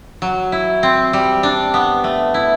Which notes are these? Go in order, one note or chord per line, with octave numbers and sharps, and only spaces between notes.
F#3
E4
C4
G3
D4
B3
A3
E4